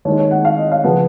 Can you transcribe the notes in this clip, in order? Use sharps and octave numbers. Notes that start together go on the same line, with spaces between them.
D#2 D#3 G#3 C#5
C#5
F#5
F5
D#5
F5
C#3 F3 B3 F#5